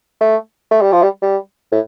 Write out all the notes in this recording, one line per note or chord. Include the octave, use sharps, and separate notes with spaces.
A3
A3
G3
F3
G3
G3
A2